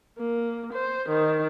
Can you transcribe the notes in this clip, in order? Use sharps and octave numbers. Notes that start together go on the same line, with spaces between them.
A#3
C5
D#3